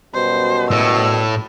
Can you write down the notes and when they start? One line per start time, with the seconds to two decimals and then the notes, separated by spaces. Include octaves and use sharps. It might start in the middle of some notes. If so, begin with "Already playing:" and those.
0.14 F#2 B2 G3 C5
0.71 A2 E6